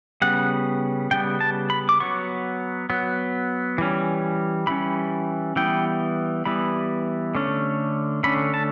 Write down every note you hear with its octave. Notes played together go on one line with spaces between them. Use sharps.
C#3 G3 B3 F#5
C#3 G3 B3 G5
A5
B5
D6
F#3 B3 C#6
F#3 B3
E3 G3 C#4
E3 G3 C#4 B5
E3 G3 B3 G5
E3 G3 B3 B5
D3 A3 C#4
D3 A3 C#4 B5
A5